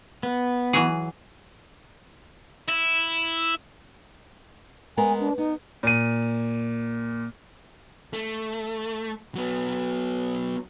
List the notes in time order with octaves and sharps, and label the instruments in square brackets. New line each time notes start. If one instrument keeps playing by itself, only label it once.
[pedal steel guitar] B3
[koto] E3 F#3 G#4
[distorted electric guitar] E4
[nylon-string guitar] G#3 B3 A#4 [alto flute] G#5
[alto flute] D4
[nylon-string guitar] B3 [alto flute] D#4
[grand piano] A#2 D#7
[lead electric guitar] A3
F#3 B3